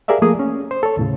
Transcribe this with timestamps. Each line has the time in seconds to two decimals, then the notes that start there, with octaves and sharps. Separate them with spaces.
0.08 G4 G#4 A#4 D5 E5 F5
0.22 F3 A3 A#3 G#4 G#5 D#6
0.39 C#4
0.71 C5
0.83 A4 C#5
0.97 D#2 A2 C#3